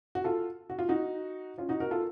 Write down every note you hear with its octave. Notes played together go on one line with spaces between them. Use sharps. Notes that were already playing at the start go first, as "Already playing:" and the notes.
F#4
F4 A4
F#4
F4
D#4 F#4
C#4 F4
D#4 F#4
F#4 A#4
F4 A4